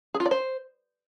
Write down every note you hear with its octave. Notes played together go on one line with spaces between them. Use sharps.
G#4
F4
D5
C5